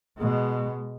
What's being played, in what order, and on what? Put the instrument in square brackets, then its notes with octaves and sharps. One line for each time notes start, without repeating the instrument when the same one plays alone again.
[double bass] B2 G#3